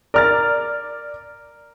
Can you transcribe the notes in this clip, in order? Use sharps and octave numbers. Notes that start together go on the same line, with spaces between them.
A#4 D5 F6 A6